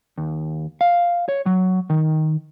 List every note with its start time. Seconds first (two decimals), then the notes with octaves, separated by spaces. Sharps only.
0.18 D#2
0.81 F5
1.28 C#5
1.46 F#3
1.90 D#3